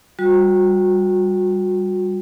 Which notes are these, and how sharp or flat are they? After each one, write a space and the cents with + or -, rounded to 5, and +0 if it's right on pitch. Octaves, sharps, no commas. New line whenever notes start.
G3 +0 F#4 -30